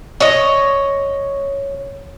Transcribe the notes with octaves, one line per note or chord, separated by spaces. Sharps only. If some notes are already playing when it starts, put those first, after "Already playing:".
C#5 D#5